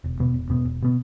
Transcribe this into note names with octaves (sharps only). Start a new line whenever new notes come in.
E1
E2 B2 B3
E1
E2 B2 B3
E1
B2 B3